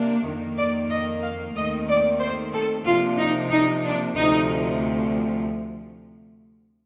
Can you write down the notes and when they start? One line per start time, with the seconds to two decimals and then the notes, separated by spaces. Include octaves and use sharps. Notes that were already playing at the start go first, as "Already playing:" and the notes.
Already playing: C3 A#3 D4
0.26 F2 D#3 A#3
0.57 D5
0.90 D#5
1.22 F5
1.55 D#2 D#3 A3 C4 D#5
1.88 D5
2.20 C5
2.53 A4
2.85 C3 F3 A#3 D4 F4
3.18 D#4
3.51 D#4
3.83 D4
4.16 D2 C3 F3 A3 D#4